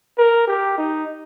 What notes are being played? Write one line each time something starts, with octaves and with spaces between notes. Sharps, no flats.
A#4
G4
D#4